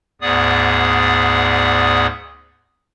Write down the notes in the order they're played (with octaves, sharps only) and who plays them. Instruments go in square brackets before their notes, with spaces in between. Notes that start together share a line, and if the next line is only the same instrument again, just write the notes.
[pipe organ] D2 G#2 B3 G#4 D5 D#6